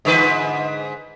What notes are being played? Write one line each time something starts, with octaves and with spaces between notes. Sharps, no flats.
G#2 D3 B4